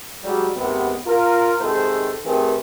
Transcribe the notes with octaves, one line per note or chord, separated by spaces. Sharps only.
G#2 F#3 G3
D#2 G#2 C3 B3
F4 A#4
G#2 C3 D#3 G#3 A4 C5
D#3 A3 C4 G4 G#4 B4